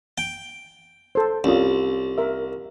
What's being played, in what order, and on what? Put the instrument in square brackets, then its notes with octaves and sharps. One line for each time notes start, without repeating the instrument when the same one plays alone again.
[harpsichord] G5
[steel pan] A4 C5
[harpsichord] C2 [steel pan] C#4 F4
[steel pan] A#4 E5